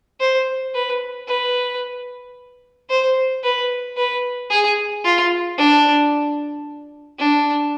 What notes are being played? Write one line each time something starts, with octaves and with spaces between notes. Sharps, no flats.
C5
B4
B4
C5
B4
B4
G#4
F4
D4
D4